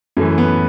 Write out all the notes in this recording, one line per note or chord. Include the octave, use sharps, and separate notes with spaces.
F#2 E3 A3
B3